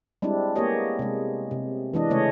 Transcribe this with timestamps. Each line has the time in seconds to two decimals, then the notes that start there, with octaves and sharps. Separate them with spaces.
0.22 G3 G#3 C4 D4 E4
0.56 A#3 B3 G4 G#4 C#5 D#5
0.99 C3 G#3
1.51 C3
1.94 E3 G#3 D4 D#5
2.10 C#3 G#3 A3 C#4 C#5 D#5